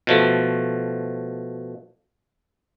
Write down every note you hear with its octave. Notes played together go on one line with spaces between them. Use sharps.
B2 F3 A3